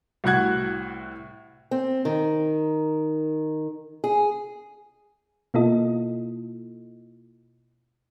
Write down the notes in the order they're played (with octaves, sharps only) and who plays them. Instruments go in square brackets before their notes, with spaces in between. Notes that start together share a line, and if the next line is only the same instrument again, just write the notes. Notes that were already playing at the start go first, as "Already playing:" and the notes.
[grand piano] C2 A2 F#4 F#6 G#6
[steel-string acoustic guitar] C4
D#3
G#4
[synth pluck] B2 A#3 E4 F4 A4 D#5